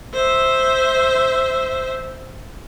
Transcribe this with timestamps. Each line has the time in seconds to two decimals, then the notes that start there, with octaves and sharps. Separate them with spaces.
0.14 C5 E5